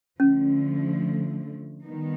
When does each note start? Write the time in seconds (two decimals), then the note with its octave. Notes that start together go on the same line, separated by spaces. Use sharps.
0.20 D3 F3 A3 C#4
1.84 D#3 G3 B3 D#4